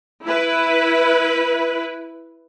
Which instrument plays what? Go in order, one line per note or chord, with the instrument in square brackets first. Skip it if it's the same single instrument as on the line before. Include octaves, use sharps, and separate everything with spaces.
[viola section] E4 B4